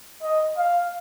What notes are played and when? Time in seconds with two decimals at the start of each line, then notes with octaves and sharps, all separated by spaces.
0.23 D#5
0.57 F5